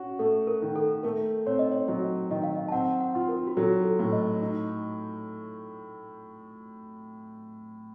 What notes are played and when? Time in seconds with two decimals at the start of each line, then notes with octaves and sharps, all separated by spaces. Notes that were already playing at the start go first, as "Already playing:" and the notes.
Already playing: C#4 F#4
0.19 A3 A4
0.47 A#4
0.62 D#3
0.76 A4
1.03 A3 A#4
1.46 C4 C#5
1.59 D#5
1.72 C#5
1.88 F#3 D#5
2.31 D#3 D#5
2.43 F5
2.55 D#5
2.68 A5
2.72 C4 F#5
3.00 F#5
3.15 F4
3.29 A#4
3.47 F#4
3.57 F#3 A4
3.84 A4
3.99 A2
4.12 D#5
4.41 D#4